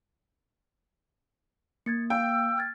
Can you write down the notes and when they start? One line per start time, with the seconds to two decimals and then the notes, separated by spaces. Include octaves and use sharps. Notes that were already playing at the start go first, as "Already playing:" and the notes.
1.86 A#3 G#6 A6 C#7
2.10 F5 G5 E6
2.58 F6 G#6 A6